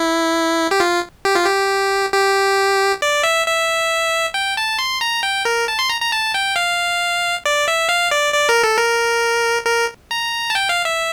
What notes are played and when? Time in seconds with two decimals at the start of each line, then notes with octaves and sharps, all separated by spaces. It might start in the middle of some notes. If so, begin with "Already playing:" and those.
Already playing: E4
0.71 G4
0.80 F4
1.25 G4
1.35 F4
1.45 G4
2.13 G4
3.02 D5
3.23 E5
3.47 E5
4.34 G5
4.57 A5
4.79 C6
5.01 A#5
5.23 G5
5.45 A#4
5.68 A5
5.79 C6
5.90 A#5
6.01 A#5
6.12 A5
6.34 G5
6.56 F5
7.46 D5
7.68 E5
7.89 F5
8.11 D5
8.34 D5
8.49 A#4
8.64 A4
8.78 A#4
9.66 A#4
10.11 A#5
10.50 A5
10.55 G5
10.69 F5
10.85 E5